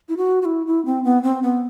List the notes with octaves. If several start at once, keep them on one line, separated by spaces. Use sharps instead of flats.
E4
F#4
F#4
E4
E4
C4
B3
C4
B3